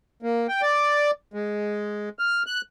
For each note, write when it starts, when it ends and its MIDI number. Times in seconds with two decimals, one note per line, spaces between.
0.23 0.47 58
0.48 0.62 79
0.62 1.11 74
1.34 2.09 56
2.19 2.43 89
2.47 2.61 90